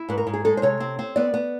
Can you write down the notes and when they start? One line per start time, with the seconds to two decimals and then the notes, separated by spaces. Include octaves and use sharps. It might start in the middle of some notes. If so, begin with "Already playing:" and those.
Already playing: E4
0.09 G#2 B4
0.18 A#4
0.27 G#2
0.34 G#4
0.45 G#3 A4
0.57 C5
0.62 C3 C#5
0.80 C4
0.99 C4
1.16 B3 D5
1.34 B3